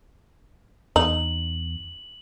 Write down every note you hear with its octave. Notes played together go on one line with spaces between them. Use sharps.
E2 D#4 F#7